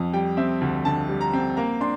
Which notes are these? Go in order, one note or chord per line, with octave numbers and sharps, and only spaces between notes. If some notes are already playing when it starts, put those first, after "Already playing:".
Already playing: F2
G3 G5
C4 E5
D2
D3 A5
G3
A#5
C4
A#3 A#5
D4 C6